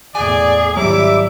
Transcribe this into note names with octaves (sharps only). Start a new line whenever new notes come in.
E2 A2 G#4 D5 G#5
G#1 F#3 G3 E4 E5 D6